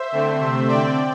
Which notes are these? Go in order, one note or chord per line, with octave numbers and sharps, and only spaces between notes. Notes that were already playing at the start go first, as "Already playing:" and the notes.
Already playing: C5 E5
D3 A3 C4
C3 A3 C4
D3 C4 D5 G5